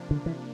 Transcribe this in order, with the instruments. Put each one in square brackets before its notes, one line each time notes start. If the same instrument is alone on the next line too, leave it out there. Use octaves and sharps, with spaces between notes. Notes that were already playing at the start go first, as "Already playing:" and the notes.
Already playing: [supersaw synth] C3 F3 A#3 D4
[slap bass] D3
E3